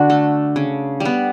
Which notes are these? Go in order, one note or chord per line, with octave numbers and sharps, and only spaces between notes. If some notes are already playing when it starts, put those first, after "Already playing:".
Already playing: D3 D4 F#4
A3
C#3
G3
B3